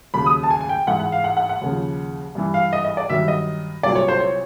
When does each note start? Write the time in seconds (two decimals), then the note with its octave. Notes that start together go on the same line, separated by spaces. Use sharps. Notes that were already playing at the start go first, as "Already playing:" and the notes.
0.14 D#2 C#3 F#3 B5
0.26 D#6
0.43 A5
0.50 G#5
0.61 G#5
0.69 G5
0.87 G#2 E3 F#5
1.00 F#5
1.12 F5
1.24 F#5
1.37 F#5
1.49 F#5
1.61 D#2 C#3 F3
2.35 G2 E3
2.54 F5
2.73 D#5
2.85 D#5
2.97 D5
3.09 G2 D#3 F#3 E5
3.28 D#5
3.83 C2 A#2 F#3 D5
3.95 C#5
4.08 C5
4.20 C#5